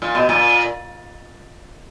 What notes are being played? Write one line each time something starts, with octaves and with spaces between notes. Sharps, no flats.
A#2
B2
A#2